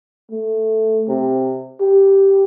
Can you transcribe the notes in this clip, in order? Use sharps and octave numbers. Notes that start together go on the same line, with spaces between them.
A3
C3
G4